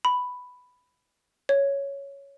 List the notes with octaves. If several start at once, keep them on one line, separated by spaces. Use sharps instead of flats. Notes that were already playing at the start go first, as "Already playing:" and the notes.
B5
C#5